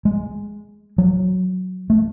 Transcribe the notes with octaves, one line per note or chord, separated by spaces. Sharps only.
G#3
F#3
A3